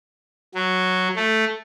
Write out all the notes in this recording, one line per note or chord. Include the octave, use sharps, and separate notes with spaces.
F#3
A3